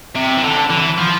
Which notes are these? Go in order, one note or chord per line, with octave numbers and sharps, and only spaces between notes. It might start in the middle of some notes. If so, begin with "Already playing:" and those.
C3
E3
D3
E3
F3